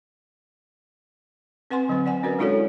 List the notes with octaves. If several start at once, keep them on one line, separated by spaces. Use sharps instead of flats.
C4 B4 F#5 G#5 C6
D3 F#3 C4 B4 C5
D5 F#5 G#5
C#4 F#4 A#4 B4 D5
G#3 D4 E4 F#4 A4 C#5